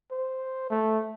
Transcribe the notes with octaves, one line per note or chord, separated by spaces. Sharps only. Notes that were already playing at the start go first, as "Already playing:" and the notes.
C5
A3